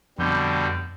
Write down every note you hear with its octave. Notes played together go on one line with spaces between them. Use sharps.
F2 B2 D3 G3 G6